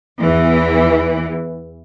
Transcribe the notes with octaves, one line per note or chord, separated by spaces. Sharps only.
E2 E3